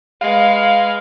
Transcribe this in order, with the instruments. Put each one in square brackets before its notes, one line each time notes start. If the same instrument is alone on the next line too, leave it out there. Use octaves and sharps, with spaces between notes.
[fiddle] G#3 B4 [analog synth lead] F5